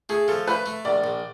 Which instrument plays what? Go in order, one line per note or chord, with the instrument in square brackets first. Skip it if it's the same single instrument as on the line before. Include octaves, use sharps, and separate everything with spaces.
[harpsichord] A3 [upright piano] G#4
[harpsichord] F3 [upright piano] A4
[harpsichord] A3 [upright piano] B4
[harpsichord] A3
[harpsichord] A#1 [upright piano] D5
[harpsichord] A#1